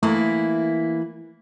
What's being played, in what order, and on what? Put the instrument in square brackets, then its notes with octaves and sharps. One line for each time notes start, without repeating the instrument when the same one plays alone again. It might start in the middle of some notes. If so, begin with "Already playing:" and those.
[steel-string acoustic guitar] E3 A#3 E4 [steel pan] A3